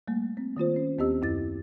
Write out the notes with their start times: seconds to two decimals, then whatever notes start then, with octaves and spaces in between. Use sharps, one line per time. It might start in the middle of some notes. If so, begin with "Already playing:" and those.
0.08 G3 A3 A#3
0.37 A#3 C4
0.57 D#3 A#3 F4 C5
0.76 C#4
0.98 D#2 B3 C4 G4 D#5 E6
1.22 F#2 E4 A6